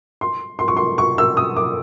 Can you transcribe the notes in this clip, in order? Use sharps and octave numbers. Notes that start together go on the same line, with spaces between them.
C6
C6
C#6
C6
C#6
E6
D#6
D6